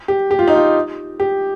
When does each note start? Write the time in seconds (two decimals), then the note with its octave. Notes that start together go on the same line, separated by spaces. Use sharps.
0.08 G4
0.31 G4
0.39 F4
0.48 D#4
0.56 F4
1.20 G4